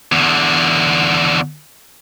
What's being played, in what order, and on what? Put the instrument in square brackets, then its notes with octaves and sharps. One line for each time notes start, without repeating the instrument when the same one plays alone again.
[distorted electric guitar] E2 D3